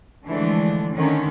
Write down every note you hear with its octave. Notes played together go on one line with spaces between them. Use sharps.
D3 E3 F3 G#3 A3 D4
D3 D#3 C#4